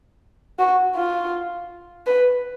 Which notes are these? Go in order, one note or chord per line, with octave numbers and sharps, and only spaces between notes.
F#4
F4
B4